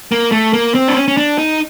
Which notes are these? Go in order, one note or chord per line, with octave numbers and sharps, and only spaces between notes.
A#3
A3
A#3
C4
D4
C#4
C#4
D4
D#4